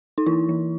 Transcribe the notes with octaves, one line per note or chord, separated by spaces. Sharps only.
D#4
E3 E4
E3